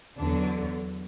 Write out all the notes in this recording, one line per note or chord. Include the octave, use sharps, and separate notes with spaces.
E2 D3 F#3 D4